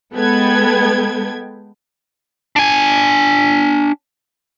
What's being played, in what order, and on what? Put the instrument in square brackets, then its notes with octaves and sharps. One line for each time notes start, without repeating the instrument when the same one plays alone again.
[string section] G#3 B3 A4 B4 G5 G#6
[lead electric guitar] D4 G#5